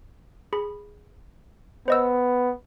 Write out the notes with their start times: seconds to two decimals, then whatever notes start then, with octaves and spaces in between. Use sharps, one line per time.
0.53 G#4 B5
1.88 B3 C5 D#5 E6